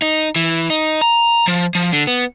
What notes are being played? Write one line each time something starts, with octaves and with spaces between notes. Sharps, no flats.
D#4
E3
D#4
A#5
F3
F3
D3
B3